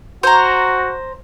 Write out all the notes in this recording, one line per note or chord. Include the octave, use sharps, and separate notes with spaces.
F#4 C5 A#5